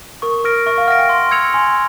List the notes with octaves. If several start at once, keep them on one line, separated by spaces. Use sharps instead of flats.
A#4 C#6
A#4 F6 A#6 D7
E5 C#6
F5
F#5 F6 A#6 D7
G5
C6
E6 G#6 C#7 F7
G#5 C6